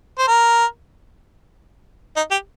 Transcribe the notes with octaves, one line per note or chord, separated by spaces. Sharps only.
C5
A#4
D#4
G4